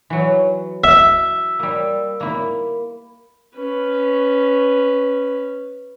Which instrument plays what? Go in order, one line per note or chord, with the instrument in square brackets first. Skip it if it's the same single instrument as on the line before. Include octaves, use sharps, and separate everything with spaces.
[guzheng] E3 F#3
[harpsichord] E5
[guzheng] G3 A#3
A#3 E4
[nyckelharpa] C#4 B4